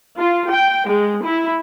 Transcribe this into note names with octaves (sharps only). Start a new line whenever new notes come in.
F4
G5
G#3
E4